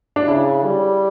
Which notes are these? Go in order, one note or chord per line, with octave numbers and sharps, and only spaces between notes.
D4
C#3 E4
G3